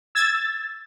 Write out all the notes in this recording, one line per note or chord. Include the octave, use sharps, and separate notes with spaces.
E6 G#6 A6